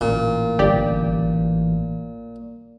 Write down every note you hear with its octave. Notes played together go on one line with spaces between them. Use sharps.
A1 A#2
G1 G4 D5